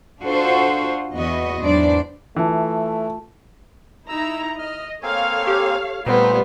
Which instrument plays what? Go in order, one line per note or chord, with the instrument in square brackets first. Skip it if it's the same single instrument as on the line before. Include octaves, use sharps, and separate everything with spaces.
[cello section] D4 F4 F#4 A4 C5
E2 B3 F#4 D#5
E2 G#2 F#3 D4 C5 D5
[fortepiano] E3 [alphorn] A3 [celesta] F4 A5
[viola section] D#4 E4 A#5 [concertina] E6
[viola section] D#5 [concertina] F6
[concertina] A#3 C4 G#5 [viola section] A4 C#5 F5
[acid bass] G4
[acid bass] A#2 [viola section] G3 A3 F4 [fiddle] B3 C5 [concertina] C4 D#4